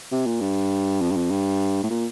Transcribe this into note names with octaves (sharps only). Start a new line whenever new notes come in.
C3
A#2
G2
F2
G2
F2
G2
A2
A#2